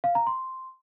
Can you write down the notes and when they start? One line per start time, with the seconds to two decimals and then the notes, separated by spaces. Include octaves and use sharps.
0.04 F5
0.15 A#5
0.27 C6